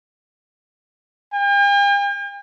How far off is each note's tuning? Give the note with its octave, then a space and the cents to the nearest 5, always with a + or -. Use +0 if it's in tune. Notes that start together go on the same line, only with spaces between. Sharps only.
G5 +45